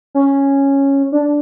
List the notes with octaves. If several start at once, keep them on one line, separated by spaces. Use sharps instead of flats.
C#4
D4